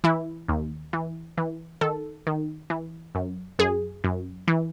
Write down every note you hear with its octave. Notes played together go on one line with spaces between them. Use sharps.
E3 E4
D#2
E3
E3
D#3 A4
D#3
E3
F#2
F#2 G#4
F#2
E3